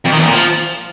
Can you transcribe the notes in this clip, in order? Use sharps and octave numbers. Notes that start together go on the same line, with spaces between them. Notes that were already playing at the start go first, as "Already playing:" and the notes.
F2
D#3
E2
A#2
F3